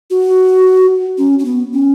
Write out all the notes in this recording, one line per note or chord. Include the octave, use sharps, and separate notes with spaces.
F#4
C#4
C#4
B3
C#4